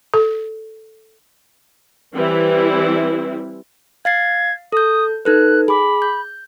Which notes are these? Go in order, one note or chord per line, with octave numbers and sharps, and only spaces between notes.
A4
E3 G3 C4 E4
F5 G#6 A6 C7
A4 D#6 G6
D#4 A4 B4 F#6
G#4 B5 D6
G6